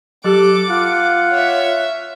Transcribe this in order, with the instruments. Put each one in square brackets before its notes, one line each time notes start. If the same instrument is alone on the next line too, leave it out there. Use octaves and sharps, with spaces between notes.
[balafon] F#3 G4 [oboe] A4 [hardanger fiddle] D6 [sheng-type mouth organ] F#6
[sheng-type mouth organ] F4 [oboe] F#5
[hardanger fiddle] C#5 E5